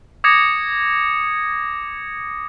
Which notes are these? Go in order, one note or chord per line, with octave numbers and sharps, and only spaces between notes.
D6 D#6 G#6 A#6 C#7